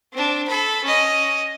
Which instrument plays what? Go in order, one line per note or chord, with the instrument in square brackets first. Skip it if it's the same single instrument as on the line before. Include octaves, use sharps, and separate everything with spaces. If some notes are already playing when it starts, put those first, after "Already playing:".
[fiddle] C4 D4
A4 B5
C#4 D#5